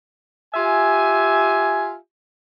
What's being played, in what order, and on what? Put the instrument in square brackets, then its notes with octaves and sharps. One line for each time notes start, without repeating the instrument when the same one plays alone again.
[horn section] F4 G4 E5 G#5